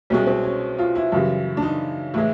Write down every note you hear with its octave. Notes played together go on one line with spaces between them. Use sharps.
C2 B2 G#3 C#4
C4
C#4
F4
E4
F#2 C#3 E3 G3
D4
D#4
A2 E3 G#3 E4